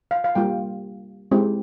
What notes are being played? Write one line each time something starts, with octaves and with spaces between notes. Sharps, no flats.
F5
F5
G3 A#3 F4 G5
G#3 C4 E4 G4